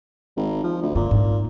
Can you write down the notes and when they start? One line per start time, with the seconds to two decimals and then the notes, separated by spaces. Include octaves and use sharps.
0.37 G#1
0.64 F3
0.82 D2
0.95 G2 A#2 D3
1.11 G#2 C4